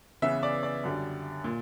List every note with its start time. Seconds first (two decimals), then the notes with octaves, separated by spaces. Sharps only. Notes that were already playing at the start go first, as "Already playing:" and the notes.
0.22 C#3 E3 B3 E5
0.43 D5
0.63 D5
0.84 F#2 D3 G3
1.44 A#2